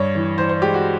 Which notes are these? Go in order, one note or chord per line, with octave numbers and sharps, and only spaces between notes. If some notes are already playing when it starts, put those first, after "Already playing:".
Already playing: G2 C#5
E3
E3 C5
C5
G#3 G4
F#4